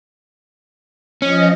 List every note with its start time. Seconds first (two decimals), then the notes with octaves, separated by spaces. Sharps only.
1.22 F3 C#4 D#5